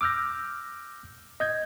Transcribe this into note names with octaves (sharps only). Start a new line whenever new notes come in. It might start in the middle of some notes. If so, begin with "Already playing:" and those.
D6 E6 F6 G6 A#6
D#5 G6 G#6